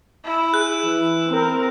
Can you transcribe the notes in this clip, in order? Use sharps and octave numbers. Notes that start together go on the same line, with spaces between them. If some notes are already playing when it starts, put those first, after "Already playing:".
E4
G#4 F#6
E3
C4 A#4